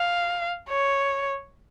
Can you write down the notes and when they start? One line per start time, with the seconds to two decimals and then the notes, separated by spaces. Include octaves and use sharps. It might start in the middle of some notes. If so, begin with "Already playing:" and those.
Already playing: F5
0.69 C#5